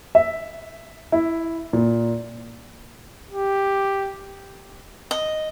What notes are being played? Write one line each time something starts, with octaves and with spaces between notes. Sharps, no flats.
E5
E4
A#2
G4
D#5